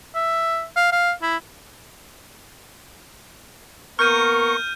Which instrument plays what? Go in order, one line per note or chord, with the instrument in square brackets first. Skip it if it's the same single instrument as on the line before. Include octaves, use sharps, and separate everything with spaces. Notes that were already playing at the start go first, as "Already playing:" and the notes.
[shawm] E5
F5
F5
E4
[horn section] A#3 B3 A#4 [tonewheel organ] C#6 [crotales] F6 G6 D#7